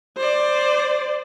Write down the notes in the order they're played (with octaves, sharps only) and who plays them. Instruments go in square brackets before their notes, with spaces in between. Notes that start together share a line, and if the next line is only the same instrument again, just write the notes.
[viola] C5 D5